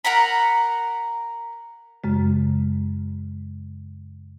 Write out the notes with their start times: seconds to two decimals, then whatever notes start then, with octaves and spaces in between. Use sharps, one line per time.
0.05 A#4 F#5 A#5 B5
2.04 F#2 C#3 G#3